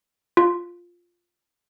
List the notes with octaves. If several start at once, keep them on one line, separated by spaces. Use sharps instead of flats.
F4